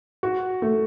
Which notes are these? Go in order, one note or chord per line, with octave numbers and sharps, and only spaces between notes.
F#4
A3